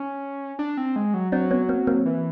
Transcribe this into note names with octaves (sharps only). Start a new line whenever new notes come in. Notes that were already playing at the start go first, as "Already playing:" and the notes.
Already playing: C#4
D4
C4
G#3
F#3
F#3 C4 D4
B3 C#4
A#3 C4
A#3 C4
E3